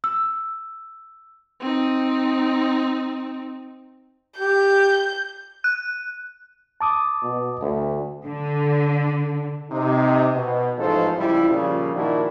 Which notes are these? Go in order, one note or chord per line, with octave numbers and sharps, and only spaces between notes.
E6
C4 D#4
G4 G6
F#6
A5 D6 D#6
B2
D2
D3
C3 D#4
B2
A1 G#2 F3 G#3 A4 C5
C#2 F3 G3 E4
A#2 C#3 F3 G3
A#2 D#3 F3 D4 E4 F#4